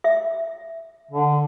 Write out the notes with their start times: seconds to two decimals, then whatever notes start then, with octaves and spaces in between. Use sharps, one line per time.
0.04 E5
1.11 D3